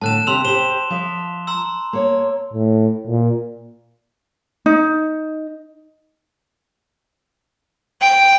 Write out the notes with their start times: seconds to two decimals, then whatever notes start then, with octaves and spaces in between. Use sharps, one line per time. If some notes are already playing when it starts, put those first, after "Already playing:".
0.02 A2 D3 A5 F#6 E7
0.27 D#2 C3 G4 C6 E6 F7
0.45 G4 C5 E7 G7
0.90 F3 E5
1.47 A#5 C6 E6
1.93 A#3 C#5
2.53 A2
3.07 A#2
4.66 D#4
8.01 G5